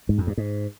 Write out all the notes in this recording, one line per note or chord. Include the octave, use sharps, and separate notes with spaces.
G#2
F2
G2
G#2